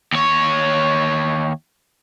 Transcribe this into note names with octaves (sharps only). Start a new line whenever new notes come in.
D#2 C#5